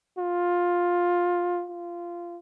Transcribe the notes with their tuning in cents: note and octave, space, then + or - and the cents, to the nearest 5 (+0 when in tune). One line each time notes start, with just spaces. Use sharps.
F4 +15
F4 -15